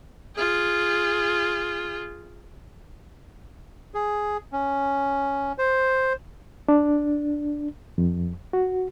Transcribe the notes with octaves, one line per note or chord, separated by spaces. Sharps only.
F4 G#4
G#4
C#4
C5
D4
F2
F#4